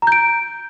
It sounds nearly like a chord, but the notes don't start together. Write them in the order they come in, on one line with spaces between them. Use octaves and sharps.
A#5 G6 D7